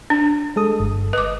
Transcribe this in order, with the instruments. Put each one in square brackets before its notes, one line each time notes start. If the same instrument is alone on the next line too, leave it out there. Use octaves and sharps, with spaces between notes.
[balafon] D4
[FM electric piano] G#3 A4 D#6
G1
[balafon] B4 D6 [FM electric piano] D#5